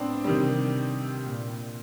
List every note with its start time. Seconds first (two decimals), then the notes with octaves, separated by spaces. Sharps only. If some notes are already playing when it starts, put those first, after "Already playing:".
Already playing: A2 B3 C4 D4
0.24 C3 D#3 G3
1.25 A#2